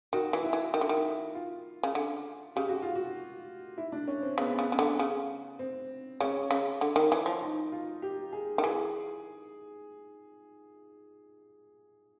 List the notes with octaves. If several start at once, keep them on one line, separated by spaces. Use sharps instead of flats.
D#3 F#4
E3
E4
E3
D#3
D3
D#3
F4
C#3
D3
C#3 G4
F#4
F4
F#4
E4
D4
C#4
C4
C#3 B3
C#3
C#3
D3
C#3
C4
C#3 C#4
C#3
D3
D#3
E3
F3
D#4
F4
G4
G#4
D#3
E3 G#4